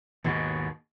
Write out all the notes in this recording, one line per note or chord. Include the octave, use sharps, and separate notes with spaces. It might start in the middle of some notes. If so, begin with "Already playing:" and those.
D#2 G#2 B2